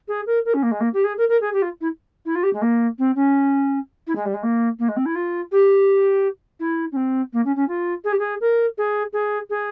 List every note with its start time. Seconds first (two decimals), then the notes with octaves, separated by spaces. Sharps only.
0.08 G#4
0.26 A#4
0.45 A#4
0.54 C#4
0.62 A#3
0.71 G#3
0.80 A#3
0.93 G4
1.04 G#4
1.17 A#4
1.28 A#4
1.40 G#4
1.53 G4
1.62 F4
1.81 E4
2.25 E4
2.35 F4
2.43 G4
2.53 G#3
2.61 A#3
2.98 C4
3.15 C#4
4.07 E4
4.15 G#3
4.25 G3
4.34 G#3
4.43 A#3
4.79 A#3
4.88 G#3
4.96 C4
5.05 E4
5.15 F4
5.51 G4
6.59 E4
6.92 C#4
6.96 C4
7.32 A#3
7.45 C#4
7.56 C#4
7.68 F4
8.04 G#4
8.12 G4
8.19 G#4
8.40 A#4
8.77 G#4
9.12 G#4
9.49 G#4